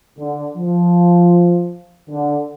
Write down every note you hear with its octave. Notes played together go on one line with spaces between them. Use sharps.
D3
F3
D3